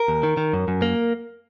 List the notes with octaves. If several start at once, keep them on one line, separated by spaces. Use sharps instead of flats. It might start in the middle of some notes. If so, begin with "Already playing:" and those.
Already playing: A#4
D#2
D#3
D#3
F#2
F#2
A#3